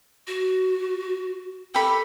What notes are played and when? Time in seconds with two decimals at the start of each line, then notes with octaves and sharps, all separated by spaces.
0.27 F#4
1.74 G4 A4 B5